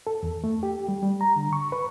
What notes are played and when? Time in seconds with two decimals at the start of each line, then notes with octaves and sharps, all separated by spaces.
0.07 A4
0.23 E2
0.44 A3
0.63 G4
0.88 G3
1.03 G3
1.21 A#5
1.36 D3
1.53 C#6
1.72 B4